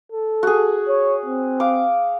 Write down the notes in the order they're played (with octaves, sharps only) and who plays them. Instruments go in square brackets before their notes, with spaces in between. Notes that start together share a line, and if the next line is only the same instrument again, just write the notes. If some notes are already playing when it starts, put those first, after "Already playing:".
[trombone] A4
[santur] F#4 G#4
[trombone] C#5
C4
[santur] F5 D6